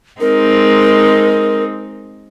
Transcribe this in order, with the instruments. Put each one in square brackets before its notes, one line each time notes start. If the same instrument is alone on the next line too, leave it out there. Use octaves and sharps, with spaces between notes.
[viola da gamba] G#3 C4 D#4 [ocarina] A#4